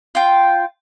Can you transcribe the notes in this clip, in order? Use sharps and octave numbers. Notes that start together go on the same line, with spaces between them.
F4 G5